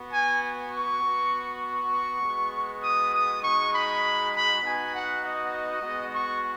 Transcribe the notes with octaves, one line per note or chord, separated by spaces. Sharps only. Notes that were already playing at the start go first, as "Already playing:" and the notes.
Already playing: B3 F#4
G#5
C#6
B3 F#4
C#6
G#3 B3 F#4
D#6
D#6
G#3 D#4 F#4 C#6
B5
B5
B3 D#4 F#4 G#5
F#5
D#5
G#3 B3 F#4
C#6